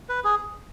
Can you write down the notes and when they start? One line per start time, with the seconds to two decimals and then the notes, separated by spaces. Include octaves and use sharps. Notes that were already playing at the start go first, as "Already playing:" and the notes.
0.09 B4
0.24 G#4